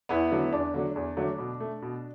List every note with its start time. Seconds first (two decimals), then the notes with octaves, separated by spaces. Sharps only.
0.09 E2 B3 E4
0.31 D3 F#3 A3
0.53 E2 D4
0.74 D3 F#3 A3
0.96 E2
1.17 D3 F#3 A3
1.38 B2
1.60 A3
1.82 B2